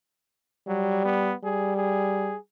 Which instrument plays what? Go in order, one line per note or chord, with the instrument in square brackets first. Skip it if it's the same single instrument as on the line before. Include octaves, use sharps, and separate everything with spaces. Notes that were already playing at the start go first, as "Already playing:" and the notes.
[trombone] F#3 [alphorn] G3
[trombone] B3
[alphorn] G3 [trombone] G#4
[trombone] G#4